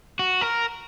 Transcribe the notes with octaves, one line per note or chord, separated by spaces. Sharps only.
F#4
A#4